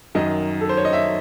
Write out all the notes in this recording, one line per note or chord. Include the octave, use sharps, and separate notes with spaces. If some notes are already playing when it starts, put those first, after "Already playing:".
F#2 D#3 F#3 D#5
A4
C5
C#5
D#5
E5